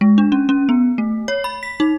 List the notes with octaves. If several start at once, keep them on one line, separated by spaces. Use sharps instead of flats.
G#3
D4
C#4
C#4
B3
A3
C#5
B5
B6
D#4